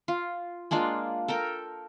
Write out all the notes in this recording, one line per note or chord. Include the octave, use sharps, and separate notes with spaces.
F4
G#3 A#3 D4 F4
A4 A#4 G5